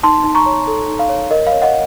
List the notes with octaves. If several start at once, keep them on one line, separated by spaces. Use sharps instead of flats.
D#4 A5 C6
D#4
A#5 C#6
C#5
A4
D#4
F5
C#5
A#4 D#5
F5
C#5
D#5 F#5